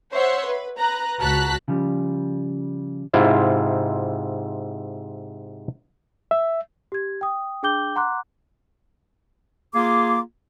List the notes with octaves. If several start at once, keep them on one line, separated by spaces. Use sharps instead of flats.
C5 C#5 E5 F#5 C6
B4
B4 A#5 F#6
C#2 F#4 A5 A#5 F#6 B6
C#3 F3 G3
G#2 C3 E4 F4 E5
E5
G4 G#6
G5 D#6
D4 G#4 G5 D6 G6 G7
F#5 A#5 C6 D6 F#6
A#3 F4 G#4 D6